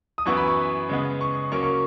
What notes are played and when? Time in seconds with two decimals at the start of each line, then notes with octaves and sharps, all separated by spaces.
0.18 D#6
0.26 F#2 E3 B3 C#6
0.37 B5
0.48 C#6
0.89 C#3 G#3 B3
1.21 C#6
1.52 C#3 F#3 A#3 C#4 C#6
1.63 C#6